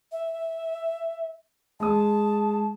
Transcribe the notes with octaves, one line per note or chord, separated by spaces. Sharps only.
E5
G#3 A5 D#6